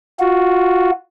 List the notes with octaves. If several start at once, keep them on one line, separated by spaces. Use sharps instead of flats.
F4 F#4